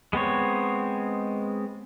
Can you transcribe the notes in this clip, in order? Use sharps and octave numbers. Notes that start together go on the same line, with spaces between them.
G#3 B3 C4 C#5